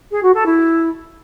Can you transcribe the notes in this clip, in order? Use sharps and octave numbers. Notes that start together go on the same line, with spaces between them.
G#4
F#4
A4
E4